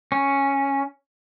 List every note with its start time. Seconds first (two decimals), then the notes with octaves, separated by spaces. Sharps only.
0.12 C#4